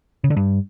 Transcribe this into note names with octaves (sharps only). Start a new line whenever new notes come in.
C#3
D3
G2